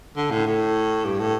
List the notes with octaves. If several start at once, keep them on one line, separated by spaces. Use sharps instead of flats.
D3
A2
A2
G2
A2